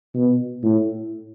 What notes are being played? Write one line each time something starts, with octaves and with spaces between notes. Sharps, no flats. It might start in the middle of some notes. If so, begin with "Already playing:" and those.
B2
A2